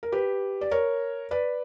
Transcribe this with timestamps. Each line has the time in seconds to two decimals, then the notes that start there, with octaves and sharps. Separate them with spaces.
0.03 A#4
0.12 G4 B4
0.61 D5
0.71 A#4 C#5
1.31 B4 D5